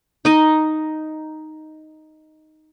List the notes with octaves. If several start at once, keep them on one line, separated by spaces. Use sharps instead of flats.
D#4 D#5